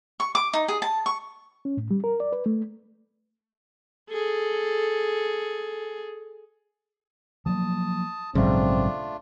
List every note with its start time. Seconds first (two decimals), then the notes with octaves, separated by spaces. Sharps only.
0.20 C#6
0.35 D6
0.53 D#4
0.68 G#4
0.82 A5
1.06 C#6
1.65 C#4
1.77 A2
1.91 G3
2.04 A#4
2.20 D5
2.32 B4
2.46 A3
4.10 G#4 A4
7.46 F3 F#3 A#3 A5 D#6
8.35 A#1 G#2 C#3 F#3 A3 C4 D4 F4